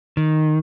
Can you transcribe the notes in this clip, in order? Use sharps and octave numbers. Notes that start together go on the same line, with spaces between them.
D#3